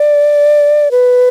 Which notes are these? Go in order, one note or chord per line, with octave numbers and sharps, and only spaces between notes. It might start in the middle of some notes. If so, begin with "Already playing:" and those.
Already playing: D5
B4